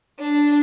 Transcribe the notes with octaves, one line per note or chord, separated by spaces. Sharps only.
D4